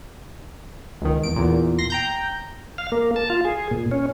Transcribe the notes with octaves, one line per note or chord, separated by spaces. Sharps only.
C#2 D#3
E2 D7
E2 A#2
C6 A#6
G5 A#5 G6
F5
A#3
A5
F4
G#4
A#2
C#4